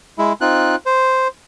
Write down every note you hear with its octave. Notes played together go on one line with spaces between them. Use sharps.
G#3 E4
C4 D#4 F4 F#6
C5